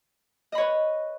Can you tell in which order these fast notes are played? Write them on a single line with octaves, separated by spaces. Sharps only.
D#5 B5 C#5 B4